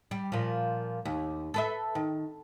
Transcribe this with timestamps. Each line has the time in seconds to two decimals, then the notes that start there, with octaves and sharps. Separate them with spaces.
0.11 G3
0.32 A#2 F3
1.05 D#2
1.54 A4 B4 E5
1.95 D#3